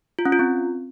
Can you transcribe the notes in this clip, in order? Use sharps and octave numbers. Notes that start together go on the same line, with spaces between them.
F4
C#4
F4
C4